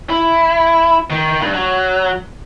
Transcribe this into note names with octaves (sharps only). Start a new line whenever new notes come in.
E4
D#3
G2
F#3